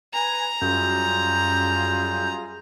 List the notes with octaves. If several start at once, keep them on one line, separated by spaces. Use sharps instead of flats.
B4 G#5 A#5
F#2 G3 F4 G#4 G6